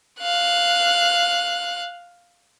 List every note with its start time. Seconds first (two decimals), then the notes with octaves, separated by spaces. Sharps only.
0.20 F5 F#6